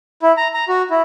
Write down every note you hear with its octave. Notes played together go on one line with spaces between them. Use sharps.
E4
A#5
A#5
F#4
E4